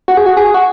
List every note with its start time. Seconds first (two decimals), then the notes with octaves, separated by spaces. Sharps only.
0.08 F#4
0.17 G#4
0.26 F#4
0.37 G#4
0.54 F#4